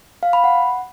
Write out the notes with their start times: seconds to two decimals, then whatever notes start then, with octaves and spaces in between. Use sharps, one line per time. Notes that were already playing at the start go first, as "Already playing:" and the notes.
0.23 F5
0.33 B5
0.44 F#5